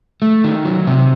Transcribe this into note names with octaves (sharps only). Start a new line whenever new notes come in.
A3
D#3
F#3
C3